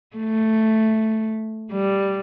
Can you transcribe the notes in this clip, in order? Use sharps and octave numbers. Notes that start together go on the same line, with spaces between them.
A3
G3